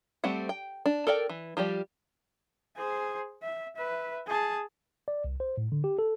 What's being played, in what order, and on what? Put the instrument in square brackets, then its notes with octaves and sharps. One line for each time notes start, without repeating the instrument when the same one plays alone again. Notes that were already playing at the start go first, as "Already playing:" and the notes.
[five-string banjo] G3 A3 C4 F#5
G5
D4
A4 A#4 D5 G5
E3
F3 G3 G4 D5
[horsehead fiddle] G#4 C5
E5
B4 E5
G#4 A5
[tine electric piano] D5
C2
C5
A2
D3
G4
A4